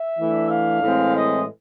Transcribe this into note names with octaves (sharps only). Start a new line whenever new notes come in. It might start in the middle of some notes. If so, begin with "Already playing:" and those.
Already playing: E5
E3 A3 D4
F5
A2 E3 G#3 C4
D#5